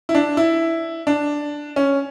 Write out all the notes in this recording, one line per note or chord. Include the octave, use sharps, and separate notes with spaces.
E4
D4
E4
D4
C#4